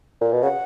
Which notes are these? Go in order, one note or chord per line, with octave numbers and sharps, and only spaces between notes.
A#2
B2
C#3 F#5